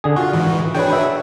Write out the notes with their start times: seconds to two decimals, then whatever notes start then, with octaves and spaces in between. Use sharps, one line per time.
0.04 D3 G#4
0.16 F4 F#4
0.33 G#2 D#3 E3
0.75 D4 F#4 G#4 B4 C#5 G5
0.93 E5